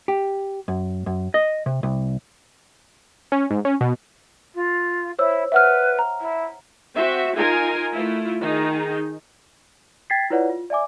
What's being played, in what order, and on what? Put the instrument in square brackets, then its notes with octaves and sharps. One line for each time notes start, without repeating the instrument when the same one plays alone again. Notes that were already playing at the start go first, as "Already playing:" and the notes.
[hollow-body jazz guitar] G4
F#2
F#2
D#5
C3
C2
[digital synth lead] C#4
G#2
C#4
B2
[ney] F4
[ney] E4 [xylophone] C5 C#5 E6
[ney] B4 [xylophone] E5 F#5 F6
[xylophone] A#5
[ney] E4
[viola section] C4 F#4 E5
D#4 F4 A#4 G#5
A3 E4 F4
D#3 D#4 G#4
[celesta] G5 G#6 A6 B6 C7
E4 F4 B4 C#5 D5 F#5
F4
D5 E5 G#5 D6